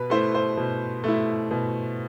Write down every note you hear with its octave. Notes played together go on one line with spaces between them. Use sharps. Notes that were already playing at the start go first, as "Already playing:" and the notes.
Already playing: B2 B4
A3 E4 C5
C5
B2
A3 E4
B2